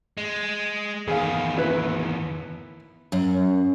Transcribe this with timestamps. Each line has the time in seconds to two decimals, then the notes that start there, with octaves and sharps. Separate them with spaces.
0.17 G#3
1.08 E2 D#3 G#4 F5
1.58 E4 B4
3.12 F#2